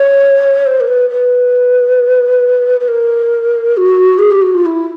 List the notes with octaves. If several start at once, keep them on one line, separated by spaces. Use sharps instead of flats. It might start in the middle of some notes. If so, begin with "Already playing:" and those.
Already playing: C#5
C5
A#4
B4
B4
B4
A#4
F#4
G#4
G4
F#4
F4
E4